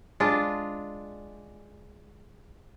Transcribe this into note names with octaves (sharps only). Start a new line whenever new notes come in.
G#3 D4 F4